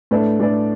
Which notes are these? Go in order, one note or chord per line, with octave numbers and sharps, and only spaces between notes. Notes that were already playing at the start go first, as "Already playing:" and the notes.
A2 A3 D4 B4 D5
A2 A3 D4 B4 D5